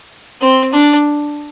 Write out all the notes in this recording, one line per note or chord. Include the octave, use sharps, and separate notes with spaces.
C4
D4